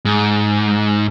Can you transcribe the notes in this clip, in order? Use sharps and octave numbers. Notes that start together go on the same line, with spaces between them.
G#2